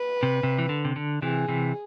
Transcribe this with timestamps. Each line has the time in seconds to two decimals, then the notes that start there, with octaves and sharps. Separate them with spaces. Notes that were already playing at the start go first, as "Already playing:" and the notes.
Already playing: B4
0.23 C3
0.43 C3
0.59 E3
0.69 D3
0.85 C3
0.96 D3
1.22 C3 E3 G#4
1.48 C3 E3